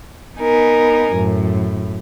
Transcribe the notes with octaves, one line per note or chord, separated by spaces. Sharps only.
B3 D#4 A#4 G#5
F#2 A2